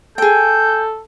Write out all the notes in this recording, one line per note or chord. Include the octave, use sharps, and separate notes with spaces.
G#4 A4 G5 G6